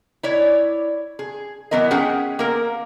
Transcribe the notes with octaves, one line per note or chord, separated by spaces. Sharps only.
E4 C#5 D5
G#4
E3 F#3 B3 A#4 D#5
C#4 G#4 F#5 G5
A#3 A#4